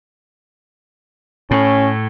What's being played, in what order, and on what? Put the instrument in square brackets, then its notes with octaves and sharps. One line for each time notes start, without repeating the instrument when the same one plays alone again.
[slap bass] A2 [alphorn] C#4